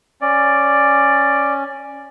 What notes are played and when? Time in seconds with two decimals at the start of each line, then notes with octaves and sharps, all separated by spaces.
0.22 C#4 D5